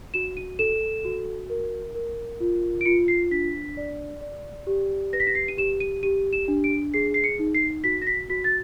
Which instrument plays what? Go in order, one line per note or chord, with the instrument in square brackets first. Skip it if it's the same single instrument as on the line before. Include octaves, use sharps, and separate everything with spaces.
[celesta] F#4 E7
D#7
A4 E7
F#4
A#4
A#4
F4
D7
F4 C#7
C7
D4 B6
D5
D5
G4
B4 A#6
B6
A#6
C7
D#7
G4 E7
D#7
G4 D#7
E7
D4
D7
G#4 C7
C7
C#7
D#4
C7
F#4 B6
A#6
B6
F#4 B6
A6